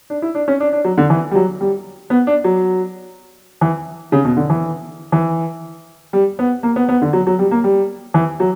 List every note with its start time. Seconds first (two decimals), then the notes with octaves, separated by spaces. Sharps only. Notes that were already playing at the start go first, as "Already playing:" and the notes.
0.10 D4
0.22 E4
0.35 D4
0.48 C#4
0.60 D4
0.73 D4
0.84 F#3
0.98 D3
1.10 E3
1.31 G3
1.35 F#3
1.61 G3
2.10 B3
2.27 D4
2.44 F#3
3.61 E3
4.12 C#3
4.25 B2
4.37 D3
4.50 E3
5.12 E3
6.13 G3
6.39 B3
6.63 A#3
6.76 B3
6.89 B3
7.02 D3
7.13 F#3
7.27 F#3
7.39 G3
7.51 A#3
7.64 G3
8.14 E3
8.40 F#3